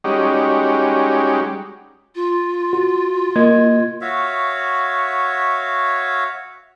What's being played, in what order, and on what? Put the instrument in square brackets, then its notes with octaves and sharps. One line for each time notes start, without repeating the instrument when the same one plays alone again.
[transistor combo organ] G3 G#3 C#4 D#4 F#4 G4
[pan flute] F4
[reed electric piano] F#4
A#3 D#5 G#6
[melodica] F#4 C#5 E5 F5